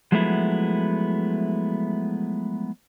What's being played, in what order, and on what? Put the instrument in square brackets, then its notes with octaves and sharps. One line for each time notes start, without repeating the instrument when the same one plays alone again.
[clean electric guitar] F3 F#3 G#3 A3 B3 E4